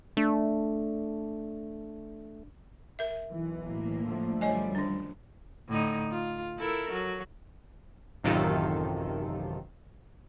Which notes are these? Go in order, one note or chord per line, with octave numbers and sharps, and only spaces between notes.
A3 D4
A#4 E5
B1 E3
A2 A#3
D3 F3 A3
F#2 G3 C#5 D#5 G#5
D#3 D4
A2 D3 D#4
F4
E4 A4 A#4
F#3
A1 F#2 C3 D#3 F4 A4